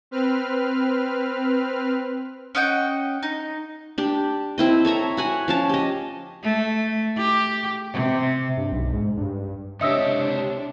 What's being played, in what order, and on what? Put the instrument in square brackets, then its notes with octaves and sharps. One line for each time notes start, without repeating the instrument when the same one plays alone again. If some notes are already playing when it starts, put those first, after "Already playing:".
[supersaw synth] C4 B4 F6
[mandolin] C#4 D#5 F#5 G5
D#4
[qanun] D4 G4
C4 E4 D#5
A4 C#5 E5 A#5
F#4 F#5 G#5
F3 C#4 A5
G4 D#5
[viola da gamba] A3
G4
C3
[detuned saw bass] G2
B1
G#2
G2
[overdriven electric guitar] C#2 G4 [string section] C3 D4 [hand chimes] C#5 C#7 [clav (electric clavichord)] D#5 E5